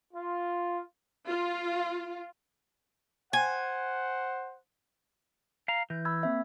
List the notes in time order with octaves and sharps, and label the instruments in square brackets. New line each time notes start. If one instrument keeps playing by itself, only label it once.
[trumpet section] F4
[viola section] F4
[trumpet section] C5 F#5 [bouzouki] G#5
[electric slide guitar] F5 A#5
[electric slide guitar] E3 [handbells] G6
[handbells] B5 E6 G#6
A#3 C4 E5